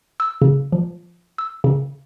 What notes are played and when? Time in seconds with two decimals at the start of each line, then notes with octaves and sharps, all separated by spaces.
0.20 E6
0.42 C#3
0.72 F3
1.38 E6
1.64 C#3